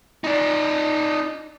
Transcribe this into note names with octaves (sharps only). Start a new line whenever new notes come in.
D#4 D5